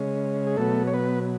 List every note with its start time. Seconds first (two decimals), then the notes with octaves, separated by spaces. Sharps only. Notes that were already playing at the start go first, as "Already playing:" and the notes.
Already playing: C#3 G#3 C#4
0.47 G#4
0.56 B2 F#3 A3 B3 A4
0.87 C#5
0.94 B3 B4